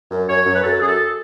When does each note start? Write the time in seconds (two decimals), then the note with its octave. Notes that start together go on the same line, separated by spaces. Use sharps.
0.11 F#2
0.28 F#2 C#5
0.46 F#2
0.55 B4
0.63 F#2 A4
0.81 F#2 G#4
0.88 A4